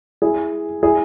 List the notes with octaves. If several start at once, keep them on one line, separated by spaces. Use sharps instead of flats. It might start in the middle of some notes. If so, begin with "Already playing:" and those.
E4 G#4
E4 G#4